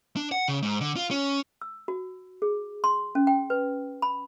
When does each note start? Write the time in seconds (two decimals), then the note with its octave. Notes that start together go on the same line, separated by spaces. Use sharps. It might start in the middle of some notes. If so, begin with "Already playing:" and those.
0.16 D4
0.32 F#5
0.48 C#3
0.63 G#2
0.81 D3
0.96 F4
1.11 C#4
1.61 E6
1.88 F#4
2.42 G#4
2.84 C6
3.15 C#4
3.27 G5
3.50 B4
4.02 B5